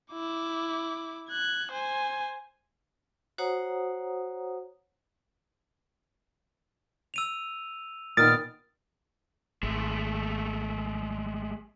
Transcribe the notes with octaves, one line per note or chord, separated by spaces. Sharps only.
E4 D6
F#6 G#6
C5 G#5
F#4 C5 C#5 F#5 A#5 D#6
E6 D#7 F7
A#2 D#3 B3 D#6 F6 A6 D7
G#1 G#3 A3